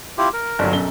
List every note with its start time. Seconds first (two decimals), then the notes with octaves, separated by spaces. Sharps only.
0.18 E4 F4 G4
0.33 A#4
0.59 G1 F#3
0.73 B1 F#2 G7